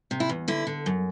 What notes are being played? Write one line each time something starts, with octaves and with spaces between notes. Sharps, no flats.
C3
E4
E2
D3 E4
D3
F#2